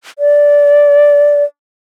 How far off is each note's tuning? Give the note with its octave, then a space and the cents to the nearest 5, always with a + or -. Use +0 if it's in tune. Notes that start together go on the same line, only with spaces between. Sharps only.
D5 -15